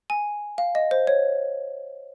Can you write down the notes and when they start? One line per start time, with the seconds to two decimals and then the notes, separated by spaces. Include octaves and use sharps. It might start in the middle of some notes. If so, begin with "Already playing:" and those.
0.10 G#5
0.58 F5
0.75 D#5
0.91 C5
1.07 C#5